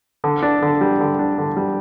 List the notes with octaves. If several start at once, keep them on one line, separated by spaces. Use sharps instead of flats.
D3
D4
D3
G3
D3
D4
D3
G3